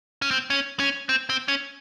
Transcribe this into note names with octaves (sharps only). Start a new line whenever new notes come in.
C#4
C4
C#4
C#4
C4
C4
C#4